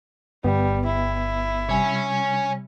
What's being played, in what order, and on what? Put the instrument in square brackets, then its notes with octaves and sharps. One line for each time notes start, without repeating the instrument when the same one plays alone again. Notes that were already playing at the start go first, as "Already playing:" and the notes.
[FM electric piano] G1 [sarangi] G3 [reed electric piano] B3
[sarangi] E4
[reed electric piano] C3 G3 [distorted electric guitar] C#5 G#5